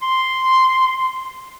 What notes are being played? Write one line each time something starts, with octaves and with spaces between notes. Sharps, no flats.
C6